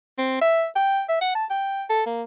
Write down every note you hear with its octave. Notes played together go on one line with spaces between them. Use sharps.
C4
E5
G5
E5
F#5
A5
G5
A4
A#3